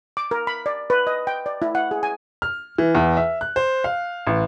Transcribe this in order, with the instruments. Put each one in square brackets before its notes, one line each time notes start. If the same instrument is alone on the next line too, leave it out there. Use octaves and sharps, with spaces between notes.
[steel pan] D6
A#4
B5
D5
B4
D#5
G5
D5
E4
F#5
G#4
G#5
[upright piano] F6
E3
E2
E5
F#6
C5
F5
A1